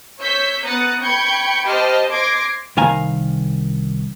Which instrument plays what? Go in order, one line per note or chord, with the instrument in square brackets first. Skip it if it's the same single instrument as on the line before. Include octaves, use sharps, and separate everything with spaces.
[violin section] C#5 C#6 E6 G6 B6
B3 A#5 D#6 F#6 A6 C#7
G5 B5 C#6 G6 G#6 C#7
G4 C5 D#5 A5 B5 F6
C6 D6 G#6 A#6 C7 D7
[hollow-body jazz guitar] C2 D#3 F5 G#5 A#5